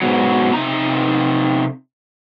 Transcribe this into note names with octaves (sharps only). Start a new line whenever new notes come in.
G#2 B2 F#3
C3 D#4 A#5